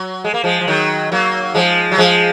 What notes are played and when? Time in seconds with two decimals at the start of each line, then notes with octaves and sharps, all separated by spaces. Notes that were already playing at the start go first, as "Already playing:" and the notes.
Already playing: F#3
0.24 G#3
0.34 A#3
0.44 F3 G#3
0.61 F3
0.67 D#3 F#3
1.12 F#3 A#3
1.54 F3 G#3
1.92 F#3
1.98 F3 G#3